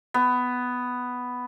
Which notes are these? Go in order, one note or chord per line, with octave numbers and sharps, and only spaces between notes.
B3